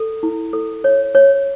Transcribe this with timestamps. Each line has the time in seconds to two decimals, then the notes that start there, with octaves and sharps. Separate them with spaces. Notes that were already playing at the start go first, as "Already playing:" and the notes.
Already playing: A4
0.23 E4
0.53 A4
0.84 C#5
1.15 C#5